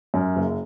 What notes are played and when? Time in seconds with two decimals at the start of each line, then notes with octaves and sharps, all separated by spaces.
0.14 F#2
0.36 F#1